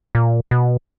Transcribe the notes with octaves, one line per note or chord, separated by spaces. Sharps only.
A#2
B2